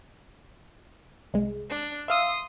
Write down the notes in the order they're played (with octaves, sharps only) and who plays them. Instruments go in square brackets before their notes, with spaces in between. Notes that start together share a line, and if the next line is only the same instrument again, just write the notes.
[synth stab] C2 G#3
[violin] D4
[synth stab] E5 F5 E6 [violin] C6 D#6